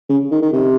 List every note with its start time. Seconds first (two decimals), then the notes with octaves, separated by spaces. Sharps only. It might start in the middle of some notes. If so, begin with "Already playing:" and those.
0.09 C#3
0.32 D#3
0.42 D#3
0.53 C3